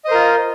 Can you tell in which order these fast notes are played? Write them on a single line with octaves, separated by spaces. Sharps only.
D#5 C5 A#4 F4